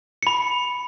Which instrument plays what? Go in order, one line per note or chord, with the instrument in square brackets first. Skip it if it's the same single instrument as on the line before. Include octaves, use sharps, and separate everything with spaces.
[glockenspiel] B5 C#7